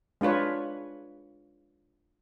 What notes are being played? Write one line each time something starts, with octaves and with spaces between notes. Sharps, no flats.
G#3 D4 F4 B4 C#5